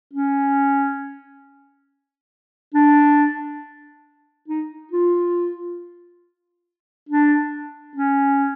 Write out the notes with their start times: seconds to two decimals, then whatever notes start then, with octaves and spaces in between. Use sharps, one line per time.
0.13 C#4
2.74 D4
4.48 D#4
4.92 F4
7.09 D4
7.95 C#4